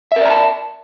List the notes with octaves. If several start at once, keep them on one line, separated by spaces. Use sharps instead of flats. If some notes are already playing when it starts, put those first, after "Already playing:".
A#4 D5 E5 A5 A#5